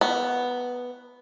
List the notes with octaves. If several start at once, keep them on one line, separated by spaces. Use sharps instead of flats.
B3